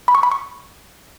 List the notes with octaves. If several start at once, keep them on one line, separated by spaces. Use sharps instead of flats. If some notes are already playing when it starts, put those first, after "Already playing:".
B5
C#6
B5
C#6